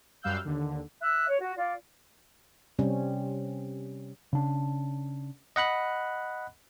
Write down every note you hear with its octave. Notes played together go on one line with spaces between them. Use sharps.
F#2 G3 F5 E6 F#6 G6
D#2 D3
E5 F#6
C#5
F#4
F4 D5
C3 G3 C4 C#4
C#3 D4
D#5 F#5 B5 F#6